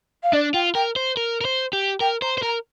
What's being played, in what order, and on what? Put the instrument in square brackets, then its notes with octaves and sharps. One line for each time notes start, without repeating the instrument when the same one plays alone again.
[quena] F5
[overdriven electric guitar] D4 [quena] D5
[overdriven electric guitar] F4 [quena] G5
[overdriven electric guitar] A#4 [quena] G5
[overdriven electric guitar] C5
A#4
A#4
C5
G4
[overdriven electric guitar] A#4 [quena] G5
[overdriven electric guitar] C5 [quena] A#5
[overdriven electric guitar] C5
[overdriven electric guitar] A#4 [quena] A#5